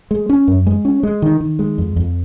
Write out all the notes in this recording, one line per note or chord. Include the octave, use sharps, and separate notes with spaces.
G#3
C#4
F#2
G#3
C#4
G#3
D#3
D#3
G#3
F2
F2